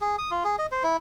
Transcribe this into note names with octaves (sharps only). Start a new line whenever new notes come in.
G#4
D#6
F4
G#4
D#5
C5
E4